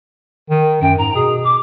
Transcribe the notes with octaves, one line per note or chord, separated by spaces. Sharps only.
D#3
F#2 G5
G#2 A#5
B2 G#4
D6